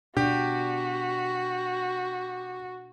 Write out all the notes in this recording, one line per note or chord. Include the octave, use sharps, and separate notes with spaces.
B2 D4 F#4 G4